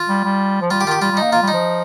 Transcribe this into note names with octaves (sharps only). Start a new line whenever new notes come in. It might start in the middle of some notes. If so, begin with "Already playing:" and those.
Already playing: F4
G3
G3
F3
G3 F4
G4
D#3 F4
G4
G3 F4
G3
A#3 D#4
A#3 F4
G3
D#4
F3